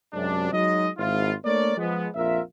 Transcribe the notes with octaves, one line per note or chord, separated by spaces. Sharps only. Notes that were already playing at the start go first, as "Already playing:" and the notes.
F#2 C3 G#3 D4
F#3 G#3 D#4 D#5
G#1 G#2 E4 F4
A3 A#3 D4 A#4 C#5 D5
F3 G#3 B3
A#1 F2 F4 A#4 E5